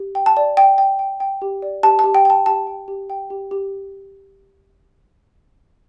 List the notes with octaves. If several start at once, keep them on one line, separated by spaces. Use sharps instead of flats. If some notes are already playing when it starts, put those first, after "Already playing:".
Already playing: G4
G5
A5
D5
G5
G5
G5
G5
G4
D5
G4 A5
A5
G4
G5
G5 A5
G4 A5
G5
G4
G5
G4
G4